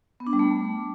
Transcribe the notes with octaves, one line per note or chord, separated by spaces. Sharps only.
B3
D4
G3
A3